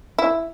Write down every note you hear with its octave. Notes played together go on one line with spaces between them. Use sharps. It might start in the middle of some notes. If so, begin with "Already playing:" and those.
E4